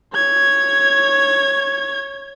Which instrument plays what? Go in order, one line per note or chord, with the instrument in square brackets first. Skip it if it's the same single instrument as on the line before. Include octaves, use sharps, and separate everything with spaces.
[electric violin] C#5 G#6